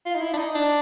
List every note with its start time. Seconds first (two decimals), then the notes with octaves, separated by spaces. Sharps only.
0.06 F4
0.15 D#4
0.21 E4
0.34 D4
0.37 D#4
0.55 D4